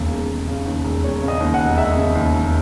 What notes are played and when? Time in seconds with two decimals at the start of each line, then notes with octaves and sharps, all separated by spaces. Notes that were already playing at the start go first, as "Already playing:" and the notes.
Already playing: E1 D#2 C#3
0.11 E1
0.29 E1
0.48 C#3
0.66 D#2
0.84 E1
1.03 E1 C#5
1.22 C#3
1.28 D#5
1.40 D#2
1.54 F#5
1.60 E1
1.78 E1 E5
1.97 C#3
2.15 D#2
2.35 E1